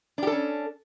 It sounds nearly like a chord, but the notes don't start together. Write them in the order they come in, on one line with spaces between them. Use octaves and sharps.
D4 G4 A4 C#4